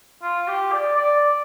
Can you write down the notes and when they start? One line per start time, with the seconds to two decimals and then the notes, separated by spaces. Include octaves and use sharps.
0.22 F4
0.48 G4
0.72 D5
0.97 D5